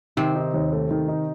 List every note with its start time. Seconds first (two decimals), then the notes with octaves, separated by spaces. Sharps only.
0.17 C3 D#3 C4
0.36 D#4
0.54 D#2
0.73 A3
0.91 D#3
1.08 D#4